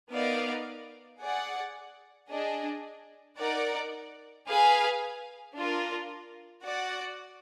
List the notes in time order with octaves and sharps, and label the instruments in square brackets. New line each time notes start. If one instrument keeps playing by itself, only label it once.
[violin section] B3 D#4 A#4 D5 F5
G#4 D5 F#5
D4 G#4 D#5
D#4 A#4 D5 F#5
G#4 B4 F5 G#5
D4 F4 A#4
F#4 D5 F#5